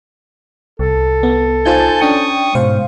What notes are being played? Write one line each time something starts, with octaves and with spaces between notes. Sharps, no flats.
C2 A4
B3
D#4 F4 C5 G#5 A5 G6
C#4 D4 G5 C#6 D#6
G#2 B2 C5 F5